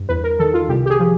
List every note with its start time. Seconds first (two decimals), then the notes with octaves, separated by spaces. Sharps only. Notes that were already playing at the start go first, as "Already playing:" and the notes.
Already playing: G2
0.09 E2 B4
0.24 A#4
0.39 D#3 A4
0.54 F4
0.69 C2 G4
0.86 G4
0.90 G#4
1.00 F3